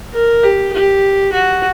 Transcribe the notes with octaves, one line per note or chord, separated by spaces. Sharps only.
A#4
G4
G4
F#4